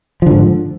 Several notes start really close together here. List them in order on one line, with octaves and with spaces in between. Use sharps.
F3 D3 G#2